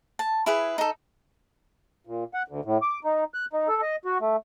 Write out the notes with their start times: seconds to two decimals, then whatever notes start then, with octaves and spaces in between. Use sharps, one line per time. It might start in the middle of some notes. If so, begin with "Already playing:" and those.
0.19 A5
0.46 E4 G#4 B4
0.78 D#4 A4
2.07 A#2
2.34 F#5
2.48 D2
2.65 A2
2.82 D6
3.04 D#4
3.34 F#6
3.53 D#4
3.68 A4
3.82 D#5
4.05 F#4
4.21 A3